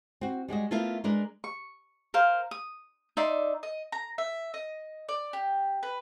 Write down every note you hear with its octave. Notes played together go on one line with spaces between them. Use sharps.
C4 F#4
G3 G#3 F#4 D#5
A3 B3 E4 F4 A#4 E5
G#3 D4 A#4 B4
C#6
A#4 C5 F5
D#6
D#4 D5 E5 C6
D#5
A#5
E5
D#5
D5
G4
B4